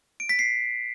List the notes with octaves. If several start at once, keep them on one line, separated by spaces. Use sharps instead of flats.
D7
B6
C7